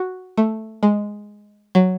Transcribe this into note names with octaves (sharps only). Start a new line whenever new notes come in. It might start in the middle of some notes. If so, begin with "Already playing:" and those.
Already playing: F#4
A3
G#3
F#3